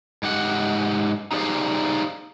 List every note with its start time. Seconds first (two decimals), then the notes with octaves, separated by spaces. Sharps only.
0.23 G#2 G4 F#5
1.32 D#4 G4 G#4 C5 D5 F5